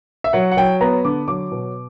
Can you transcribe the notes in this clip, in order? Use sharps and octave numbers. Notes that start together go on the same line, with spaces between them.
E5
F#3 F#5
F#5
F#3 G5
B3 A#5
D3 D6
F#3 D6
B2